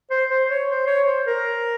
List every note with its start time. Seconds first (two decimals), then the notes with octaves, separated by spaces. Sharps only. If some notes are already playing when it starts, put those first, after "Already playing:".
0.10 C5
0.30 C5
0.50 C#5
0.69 C5
0.87 C#5
1.06 C5
1.27 A#4